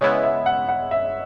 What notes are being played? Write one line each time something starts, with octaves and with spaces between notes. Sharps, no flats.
C#3 G#3 B3 E4 C#5
E5
F#5
F#5
E5